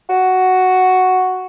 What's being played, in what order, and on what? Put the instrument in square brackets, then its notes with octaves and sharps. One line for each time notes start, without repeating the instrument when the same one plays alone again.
[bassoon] F#4